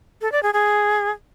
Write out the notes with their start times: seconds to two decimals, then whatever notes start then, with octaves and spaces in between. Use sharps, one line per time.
0.21 A4
0.32 D5
0.43 G#4
0.53 G#4